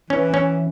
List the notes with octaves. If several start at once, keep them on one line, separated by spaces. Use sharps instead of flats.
E3 C#4
C#4